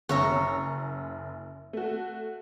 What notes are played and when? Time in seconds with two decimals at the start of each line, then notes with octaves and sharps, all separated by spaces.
0.09 F#1 F#2 C#5 E5 A#5
1.73 A3 F#4